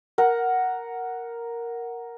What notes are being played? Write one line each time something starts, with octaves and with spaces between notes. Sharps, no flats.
A#4 F#5